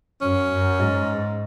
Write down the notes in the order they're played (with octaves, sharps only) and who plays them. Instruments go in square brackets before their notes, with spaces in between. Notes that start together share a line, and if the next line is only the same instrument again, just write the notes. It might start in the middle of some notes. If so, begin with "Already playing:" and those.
[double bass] F#2 [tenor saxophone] C#4
[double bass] F#2
G#2